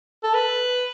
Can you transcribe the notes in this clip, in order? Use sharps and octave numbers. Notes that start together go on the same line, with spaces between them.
A4
B4